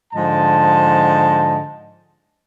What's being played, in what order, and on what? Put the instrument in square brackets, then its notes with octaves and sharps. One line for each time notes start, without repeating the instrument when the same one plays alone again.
[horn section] G#2 D3 F3 D#5 A5